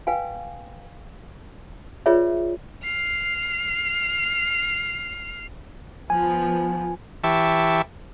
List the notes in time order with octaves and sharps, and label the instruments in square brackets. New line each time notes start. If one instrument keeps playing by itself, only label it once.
[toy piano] B4 F5 G5 G#5
F4 G#4 B4 C#5 D5 E5
[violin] F6 C7
[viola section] F3 B3 [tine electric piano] G#5
[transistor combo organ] E3 G4 E5 A5 C#6